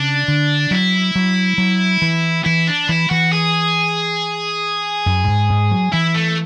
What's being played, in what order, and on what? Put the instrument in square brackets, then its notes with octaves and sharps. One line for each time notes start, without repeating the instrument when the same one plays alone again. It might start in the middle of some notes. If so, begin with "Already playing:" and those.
Already playing: [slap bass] C#3 [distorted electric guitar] D4
[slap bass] D3
[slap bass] F#3 [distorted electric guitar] E4
[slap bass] F#3
F#3
E3
[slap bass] E3 [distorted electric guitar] E4
[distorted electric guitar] D4
[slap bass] E3 [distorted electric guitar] E4
[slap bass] E3 [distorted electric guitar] F#4
[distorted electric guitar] G#4
[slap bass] F#2
G#2
G#2
F#3
[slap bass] E3 [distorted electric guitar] E4
[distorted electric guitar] A3